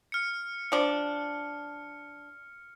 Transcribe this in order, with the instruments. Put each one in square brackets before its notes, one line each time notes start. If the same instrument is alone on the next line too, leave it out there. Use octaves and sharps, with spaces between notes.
[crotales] F6 C#7
[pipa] F3 D4